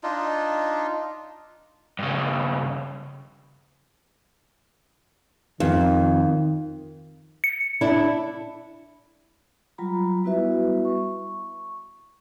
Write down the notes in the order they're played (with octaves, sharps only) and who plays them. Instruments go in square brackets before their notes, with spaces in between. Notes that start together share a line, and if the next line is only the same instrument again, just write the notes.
[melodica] D4 D#4 F4
[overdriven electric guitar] G2 C#3
[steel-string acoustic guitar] F2 [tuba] D#3
[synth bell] C#7
[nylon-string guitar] D4 E4
[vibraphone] F#3 G3 F4 A#5 B5
G3 B3 E4 F#4 B4 E5
C#6